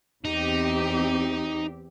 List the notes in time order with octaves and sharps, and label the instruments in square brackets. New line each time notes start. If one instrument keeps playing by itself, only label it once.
[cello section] E2 C4 G4 [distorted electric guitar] D#4